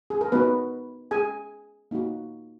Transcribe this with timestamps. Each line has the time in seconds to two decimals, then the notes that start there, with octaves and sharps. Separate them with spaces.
0.10 G#4
0.21 A#4
0.32 B3 D#4 F#4 B4
1.11 G#4 G#5
1.91 A#3 D#4 F#4